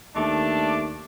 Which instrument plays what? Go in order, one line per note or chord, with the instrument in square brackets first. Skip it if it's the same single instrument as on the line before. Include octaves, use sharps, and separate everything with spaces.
[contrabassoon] D#2 [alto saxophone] A3 [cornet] D4 [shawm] D6